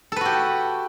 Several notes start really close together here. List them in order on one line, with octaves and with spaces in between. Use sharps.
A4 B4 F#4 G4